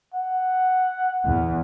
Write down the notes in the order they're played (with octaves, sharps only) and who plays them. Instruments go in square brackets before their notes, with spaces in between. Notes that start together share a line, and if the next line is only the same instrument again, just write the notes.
[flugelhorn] F#5
[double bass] E2